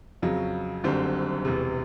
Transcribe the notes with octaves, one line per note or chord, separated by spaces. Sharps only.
F2 C#3 F#3
F#1 F#2 D3 G3 C4
E1 E2 C3